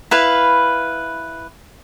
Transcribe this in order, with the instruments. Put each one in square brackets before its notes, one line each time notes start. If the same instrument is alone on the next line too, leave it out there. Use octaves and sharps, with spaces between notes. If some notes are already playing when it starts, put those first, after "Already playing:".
[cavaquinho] E4 B4 F5